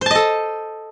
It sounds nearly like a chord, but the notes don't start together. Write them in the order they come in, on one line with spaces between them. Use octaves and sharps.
C5 A5 D#5 A4